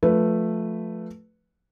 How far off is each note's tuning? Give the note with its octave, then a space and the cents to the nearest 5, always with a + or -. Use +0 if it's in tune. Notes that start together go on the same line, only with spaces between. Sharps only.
F3 +20 A3 +0 B4 +0